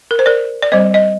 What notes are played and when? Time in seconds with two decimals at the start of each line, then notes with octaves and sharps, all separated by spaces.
0.11 A#4
0.19 C5
0.26 A#4 D5
0.62 D5
0.72 G3 C4 C5 D#5
0.94 D#5